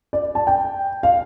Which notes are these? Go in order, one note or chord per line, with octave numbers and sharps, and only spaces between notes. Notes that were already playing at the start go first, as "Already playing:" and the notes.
D5
A5
G5
F5